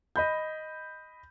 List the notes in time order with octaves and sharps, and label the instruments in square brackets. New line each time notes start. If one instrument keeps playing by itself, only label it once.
[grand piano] D#5 B5 G6